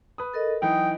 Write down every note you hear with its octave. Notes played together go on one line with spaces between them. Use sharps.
B4 D#6
A4 A#4 D#5
E3 F#3 D#4 G5 D#6